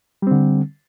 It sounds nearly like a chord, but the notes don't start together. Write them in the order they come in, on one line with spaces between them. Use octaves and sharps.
G3 C4 D3